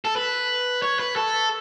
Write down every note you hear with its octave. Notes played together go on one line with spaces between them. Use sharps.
A4
B4
C#5
B4
A4